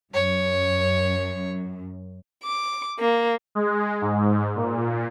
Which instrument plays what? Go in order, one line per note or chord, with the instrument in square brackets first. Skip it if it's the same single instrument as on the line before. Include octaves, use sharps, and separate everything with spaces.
[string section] F#2 [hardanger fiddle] C#5
[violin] D6
A#3
[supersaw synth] G#3
G#2
A#2